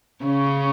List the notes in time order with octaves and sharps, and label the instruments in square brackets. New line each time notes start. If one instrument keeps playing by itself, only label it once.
[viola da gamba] C#3 C#4